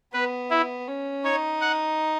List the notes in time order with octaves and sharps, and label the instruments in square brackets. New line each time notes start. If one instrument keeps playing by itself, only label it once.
[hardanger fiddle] B3 [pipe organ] B4
[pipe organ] E4
[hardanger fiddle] C#4
[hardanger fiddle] D#4 [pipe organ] C#5
[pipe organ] F#5